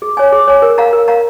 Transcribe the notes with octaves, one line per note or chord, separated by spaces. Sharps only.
G#4
C#5 G#5
G#4
C#5 G#5
A#4
F5 A#5
A#4
F5 A#5